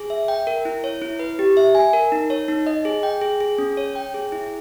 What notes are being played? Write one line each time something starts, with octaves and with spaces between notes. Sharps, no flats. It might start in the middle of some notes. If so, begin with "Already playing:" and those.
Already playing: G#4
E5
G5
A#4
E4
C#5
E4
B4
G4
E5
G#5
A#4
D#4
C#5
D#4
D#5
G#4
G5
G#4
G#4
C#4
C#5
G5
G#4
E4